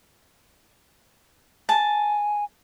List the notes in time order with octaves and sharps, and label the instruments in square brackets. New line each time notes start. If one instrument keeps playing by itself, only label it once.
[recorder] G#5 [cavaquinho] A5